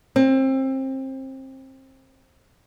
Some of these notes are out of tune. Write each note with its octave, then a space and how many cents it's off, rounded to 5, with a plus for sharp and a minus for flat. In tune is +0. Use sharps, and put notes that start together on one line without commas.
C4 +25